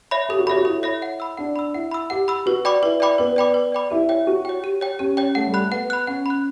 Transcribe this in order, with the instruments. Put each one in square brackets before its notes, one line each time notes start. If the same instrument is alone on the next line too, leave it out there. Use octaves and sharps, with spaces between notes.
[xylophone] C#5 E5 B5
[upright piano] G4 [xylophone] A4
[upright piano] F#4
[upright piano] G4 [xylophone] C#5 E5 B5
[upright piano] F#4
[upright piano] E4 [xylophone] A4
[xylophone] C#5 E5 B5
F#5
B5 E6
[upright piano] D4 [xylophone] F#5
[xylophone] B5 E6
[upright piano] E4 [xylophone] F#5
[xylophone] B5 E6
[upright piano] G4 [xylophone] F#5
[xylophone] B5 E6
[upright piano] F#4 [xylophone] B4
[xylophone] D5 G5 B5 D6
[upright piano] E4 [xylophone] B4
[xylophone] D5 G5 B5 D6
[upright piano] B3 [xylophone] B4
[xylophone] D5 G5 B5 D6
B4
D5 G5 B5 D6
[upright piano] E4 [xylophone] G4
[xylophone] C#5 G5
[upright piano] F#4 [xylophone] G4
[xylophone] C#5 G5
G4
C#5 G5
[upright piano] C#4 [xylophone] G4
[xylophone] C#5 G5
[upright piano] A3 [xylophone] F#5
[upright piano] G3
[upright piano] A3 [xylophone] B5 F#6
[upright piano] B3 [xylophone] F#5
[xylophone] B5 F#6
[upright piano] C#4 [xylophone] F#5
[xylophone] B5 F#6